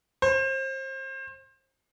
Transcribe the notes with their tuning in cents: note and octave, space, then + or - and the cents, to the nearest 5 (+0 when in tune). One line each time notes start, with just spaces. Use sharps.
C5 +30